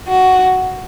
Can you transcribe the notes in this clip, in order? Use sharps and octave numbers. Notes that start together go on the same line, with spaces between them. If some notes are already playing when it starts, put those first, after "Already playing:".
F#4